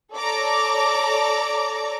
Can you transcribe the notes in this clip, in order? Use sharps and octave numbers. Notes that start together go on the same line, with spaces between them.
A4 C#5 D5 A#5 D6